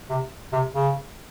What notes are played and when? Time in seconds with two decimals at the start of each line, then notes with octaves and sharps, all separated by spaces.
0.10 C3
0.53 C3
0.74 C#3